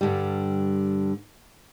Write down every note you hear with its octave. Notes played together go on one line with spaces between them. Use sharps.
G2 D3 G3